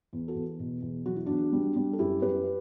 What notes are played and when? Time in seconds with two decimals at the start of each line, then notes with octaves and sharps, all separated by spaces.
0.13 E2
0.28 F#4 A4
0.35 E2
0.59 B2
0.82 E2
1.06 F#3 F#4
1.16 E4
1.26 E2 D4 F#4
1.53 G3
1.76 G3
1.93 A4
1.99 F#2 E4 G4
2.22 F#2 G4 B4